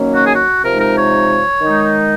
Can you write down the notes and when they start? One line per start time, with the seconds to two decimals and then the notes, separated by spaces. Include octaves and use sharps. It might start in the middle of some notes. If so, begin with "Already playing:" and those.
Already playing: D#3 F#3 A#3 C#4
0.15 F#4
0.25 G#4
0.34 F#4
0.64 C3 F3 G#3 D#4 A#4
0.80 A#4
0.97 C#5
1.61 D#3 G#3 D#4